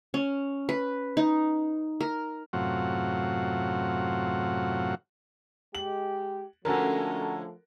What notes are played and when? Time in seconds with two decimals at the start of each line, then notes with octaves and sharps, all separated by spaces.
0.14 C#4
0.69 B4
1.17 D#4
2.01 A#4
2.53 F#2 A2 C3 F#3 F4 F#5
5.75 G#3 G4 F#7
6.65 D3 F3 G#3 A3 C#4 F#4 A4 A#4